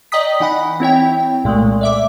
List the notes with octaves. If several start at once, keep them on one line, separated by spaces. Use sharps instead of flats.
D5 D#5 G5 A#5 D#6 B6
E3 D#4 F#5 B5
C4 E4 C#5 G5
C2 A#2 G#3 A3
D5 E5 D6